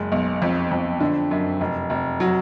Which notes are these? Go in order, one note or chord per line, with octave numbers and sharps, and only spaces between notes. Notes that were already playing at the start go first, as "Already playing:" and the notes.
Already playing: F#1 G#3
B1
F2
F2
D3
F#2
F1
F1
F#3